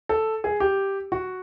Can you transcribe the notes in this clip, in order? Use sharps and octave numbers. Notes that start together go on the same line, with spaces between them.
A4
G#4
G4
F#4